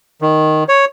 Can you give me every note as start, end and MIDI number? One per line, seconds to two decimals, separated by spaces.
0.22 0.64 51
0.69 0.85 73